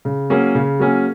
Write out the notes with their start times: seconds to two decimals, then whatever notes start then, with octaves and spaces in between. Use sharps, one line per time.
0.05 C#3
0.30 F#3 A#3 C#4 G#4
0.55 C#3
0.79 F#3 A#3 C#4 G#4